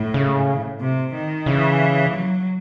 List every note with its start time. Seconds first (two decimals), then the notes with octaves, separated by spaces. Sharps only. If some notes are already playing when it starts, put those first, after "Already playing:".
Already playing: A2
0.14 C#3
0.81 C3
1.14 D#3
1.46 C#3 E3
2.14 F#3